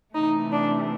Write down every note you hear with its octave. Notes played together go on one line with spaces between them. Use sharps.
C3 E3 A3 D#4
D4